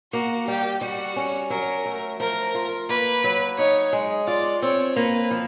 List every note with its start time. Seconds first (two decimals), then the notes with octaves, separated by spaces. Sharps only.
0.13 A#3 F#4
0.48 G3 G4
0.81 G3 F#4
1.16 C#4
1.50 F#3 A#4
1.85 A3
2.20 F3 A#4
2.54 F4
2.89 A#3 B4
3.24 F#3
3.58 D#4 C#5
3.93 G#3
4.27 F4 D5
4.62 C4 C#5
4.96 A#3 B4
5.31 F3